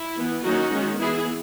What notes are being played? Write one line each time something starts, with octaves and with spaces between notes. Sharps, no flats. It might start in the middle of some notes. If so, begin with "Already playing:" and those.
Already playing: E4
E3 B3
D#3 F#3 A#3 C#4 D#4 F#4
D#3 G#3 C#4
E3 B3 E4 G#4